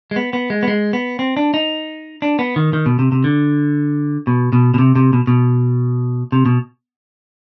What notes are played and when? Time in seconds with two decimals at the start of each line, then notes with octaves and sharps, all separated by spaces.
0.11 G#3
0.16 B3
0.33 B3
0.50 G#3
0.63 B3
0.68 G#3
0.93 B3
1.19 C4
1.37 D4
1.54 D#4
2.22 D4
2.39 B3
2.56 D#3
2.73 D#3
2.86 B2
2.99 C3
3.12 C3
3.24 D3
4.27 B2
4.53 B2
4.74 B2
4.79 C3
4.96 C3
5.13 B2
5.27 B2
6.32 C3
6.46 B2